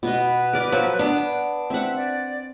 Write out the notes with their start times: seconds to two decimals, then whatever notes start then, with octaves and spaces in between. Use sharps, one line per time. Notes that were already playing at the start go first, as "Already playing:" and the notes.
0.03 B2 B4 D#5
0.53 A#4 D5 D6
0.72 F3 F#3
0.99 B3 D4
1.70 C4 E5 F#5
1.96 D5